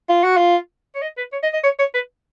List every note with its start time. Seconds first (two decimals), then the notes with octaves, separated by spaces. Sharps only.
0.09 F4
0.24 F#4
0.37 F4
0.95 C#5
1.02 D#5
1.17 B4
1.33 C#5
1.43 D#5
1.53 D#5
1.63 C#5
1.79 C#5
1.94 B4